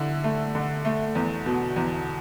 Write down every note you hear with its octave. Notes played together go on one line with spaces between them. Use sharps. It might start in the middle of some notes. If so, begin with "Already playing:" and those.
Already playing: D3 E4
A3
D3
A3
E2
B2
E2